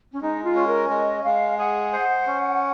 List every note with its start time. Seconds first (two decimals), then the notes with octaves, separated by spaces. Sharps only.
0.13 C#4
0.21 G#3 D#4
0.43 F4
0.55 C#4
0.66 A#4
0.89 G#3 D#5
1.24 G#3 F5
1.58 G#4 F#5
1.93 C5
2.27 C#4